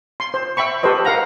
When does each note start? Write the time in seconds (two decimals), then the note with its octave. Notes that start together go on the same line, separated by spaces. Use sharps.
0.20 C6
0.34 C5
0.57 E5 G5 B5 C#6
0.83 G4 A4 B4 C5 D#5
1.05 A#4 F5 F#5 A#5